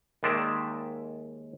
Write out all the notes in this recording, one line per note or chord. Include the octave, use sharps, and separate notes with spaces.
D#2 D#3 G#3 D5 E5